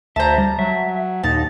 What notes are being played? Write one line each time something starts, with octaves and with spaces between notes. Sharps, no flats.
D2 C5 E5 A5 A#5
G3
F#3 E5
D#2 A#2 D#4 A5